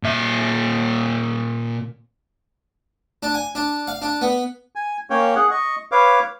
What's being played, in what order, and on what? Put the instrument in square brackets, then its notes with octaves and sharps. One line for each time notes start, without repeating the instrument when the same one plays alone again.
[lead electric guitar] A#2 E5
[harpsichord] D4
G#5
D4
F5
D4
B3
[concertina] G#5
A#3 C#4 C#5 G5
G#4 F#5
D#5 C#6
B4 C#5 F5 D6